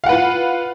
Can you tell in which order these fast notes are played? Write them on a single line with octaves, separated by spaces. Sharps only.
F5 F#5 B4 F4